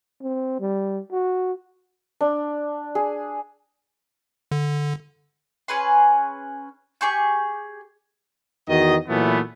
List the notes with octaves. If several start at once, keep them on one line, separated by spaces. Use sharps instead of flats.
C4
G3
F#4
D4
G#4
D3
C#4 G#4 B4 C6
G4 G#4 C#6 G6
E2 D#3 F#4 D#5
A#2 E3 F#3 A3 B3